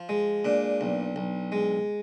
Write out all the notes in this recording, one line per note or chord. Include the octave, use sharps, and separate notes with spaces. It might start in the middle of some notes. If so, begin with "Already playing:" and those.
Already playing: F3
G#3
A#2 D4
B1
B1
G#3